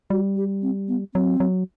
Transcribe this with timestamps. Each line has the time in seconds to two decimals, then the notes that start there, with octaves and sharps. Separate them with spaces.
0.10 G3 F#4
0.36 G4
0.62 C4
0.88 B3
1.14 F#3 C4
1.40 F#3